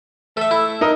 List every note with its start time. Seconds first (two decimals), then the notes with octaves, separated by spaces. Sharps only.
0.37 A3 A4 E5
0.51 E4
0.81 D#4 A#4 D#5